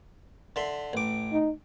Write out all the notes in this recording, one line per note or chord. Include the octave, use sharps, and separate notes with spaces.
D3 E5 C6
A1 D6
D#4